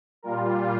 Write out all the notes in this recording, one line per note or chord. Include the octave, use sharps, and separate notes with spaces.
A#2 G3 F4 A#4